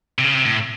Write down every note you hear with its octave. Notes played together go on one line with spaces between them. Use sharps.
C3
C#3
C3
A2